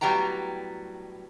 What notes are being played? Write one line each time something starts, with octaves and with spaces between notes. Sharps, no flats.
A2 F#3 G3 B3 G5 A#5